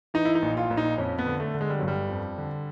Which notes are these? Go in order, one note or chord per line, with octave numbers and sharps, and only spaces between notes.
E3 D#4
E4
D#4
A#1
F4
A#1
D#4
F2 C#4
B3
D3
A3
D3
G#3
G3
G1 F#3
G3
F2
D3